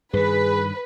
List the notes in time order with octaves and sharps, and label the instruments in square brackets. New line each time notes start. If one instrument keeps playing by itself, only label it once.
[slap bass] G2 D#3 [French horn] G#4 [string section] B4